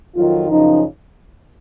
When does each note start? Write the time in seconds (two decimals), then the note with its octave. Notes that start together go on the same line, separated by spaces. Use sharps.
0.15 F2 D#3 F#3 F4
0.48 F#2 C#3 F3 D#4